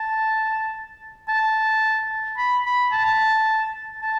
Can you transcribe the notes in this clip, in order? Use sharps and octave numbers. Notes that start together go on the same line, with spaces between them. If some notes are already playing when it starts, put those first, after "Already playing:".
Already playing: A5
A5
B5
B5
A5
A5